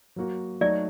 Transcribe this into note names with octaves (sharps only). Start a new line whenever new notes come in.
F#3 A#3 F#4
F#3 A3 D#4 F#4 D5